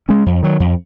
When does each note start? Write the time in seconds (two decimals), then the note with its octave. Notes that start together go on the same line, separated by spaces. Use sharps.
0.09 G#3 C#4
0.26 F2
0.43 D#3 F#3
0.60 F2